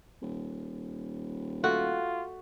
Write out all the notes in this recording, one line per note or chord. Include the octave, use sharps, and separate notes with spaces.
D#1
A3 F4 F#4